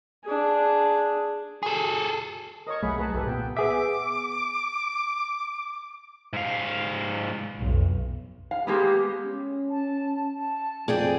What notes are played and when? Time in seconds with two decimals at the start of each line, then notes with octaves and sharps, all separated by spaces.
0.24 D4 G#4
1.63 G#4 A4
2.67 A#4 C#5 D#5 C#6
2.83 C2 F#3 A3 G#4 F#5 B5
2.97 D#4 G#4 B4 A5
3.14 C2 A2 G4 A4 B4
3.27 A#2 G#3 B3 G5
3.57 B3 G#4 E5 D6
6.33 G#2 F5
7.57 B1 F2
8.51 F5
8.67 G#3 A#3 B3 G4
9.25 C#4
9.70 A5
10.37 A5
10.88 F2 G#4 D5 G5 G#5